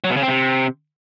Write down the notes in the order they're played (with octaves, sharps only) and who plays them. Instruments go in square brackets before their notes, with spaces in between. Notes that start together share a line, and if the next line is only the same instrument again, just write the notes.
[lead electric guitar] F#3
B2
C#3
C4
C3